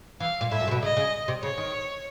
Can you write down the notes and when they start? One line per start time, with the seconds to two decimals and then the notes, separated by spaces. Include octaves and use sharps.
0.20 E3 F5
0.41 A#2
0.51 A2 E5
0.61 F#2
0.68 C3
0.71 B2
0.82 C#3 D#5
0.97 C#3
1.28 C3
1.43 C#3 C#5
1.58 D#3